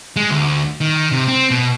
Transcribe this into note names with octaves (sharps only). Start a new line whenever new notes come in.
G#3
D2
D#3
C3
C4
B2